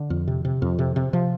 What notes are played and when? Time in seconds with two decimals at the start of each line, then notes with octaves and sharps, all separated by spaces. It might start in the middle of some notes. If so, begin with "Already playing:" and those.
Already playing: D3
0.10 F2
0.28 C3
0.45 C3
0.62 F2
0.79 C3
0.96 C3
1.13 C3 F3